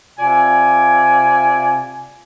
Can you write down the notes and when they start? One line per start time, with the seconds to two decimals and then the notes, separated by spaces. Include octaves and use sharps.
0.18 C3 F4 D5 G#5